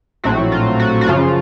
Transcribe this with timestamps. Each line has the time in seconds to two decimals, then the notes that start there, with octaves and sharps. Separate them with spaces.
0.24 A#1 A2 F#3 A3 C4 F#4
0.52 F4
0.80 F#4
1.01 F#4
1.07 F#2 C#3 F3 F4